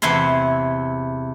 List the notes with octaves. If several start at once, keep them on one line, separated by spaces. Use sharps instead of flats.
E2 C3 E4 E5 C6